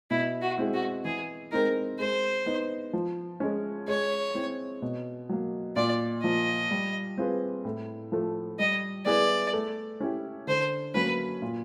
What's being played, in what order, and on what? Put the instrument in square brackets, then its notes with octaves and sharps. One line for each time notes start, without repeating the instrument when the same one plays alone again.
[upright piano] B2 [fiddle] E4
[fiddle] F#4
[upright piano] G#3 C4 E4
[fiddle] F#4
[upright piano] E3 [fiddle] G#4
[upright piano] G#3 C4 D#4 [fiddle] A#4
[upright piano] G#3 [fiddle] C5
[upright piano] B3 D#4
F3
G#3 C#4
[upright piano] G#3 [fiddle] C#5
[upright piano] C4 E4
B2
F#3 A#3
[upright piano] A#2 [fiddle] D5
[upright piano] F3 A#3 [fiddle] D#5
[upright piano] G3
C4 F4 G#4 B4
A2
F3 A3
[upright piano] G3 [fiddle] D#5
[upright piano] B3 E4 G#4 B4 [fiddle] D5
[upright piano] A3
C#4 E4 G4
[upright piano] D3 [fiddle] C5
[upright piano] F#3 A#3 C#4 [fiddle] B4
[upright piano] A#2